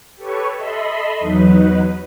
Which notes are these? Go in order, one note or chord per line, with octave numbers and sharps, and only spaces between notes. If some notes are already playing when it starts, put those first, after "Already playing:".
G4 A4 B4 C#5 C#6
A4 D#5 E5 B5 C6
E2 F#3 D#4 B4